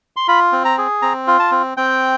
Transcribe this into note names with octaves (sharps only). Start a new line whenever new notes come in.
C6
F4 B5
C4
A#5
G#4
C4 A#5
F4
A5
C4
C4 G5